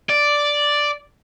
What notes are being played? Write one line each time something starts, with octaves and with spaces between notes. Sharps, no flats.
D5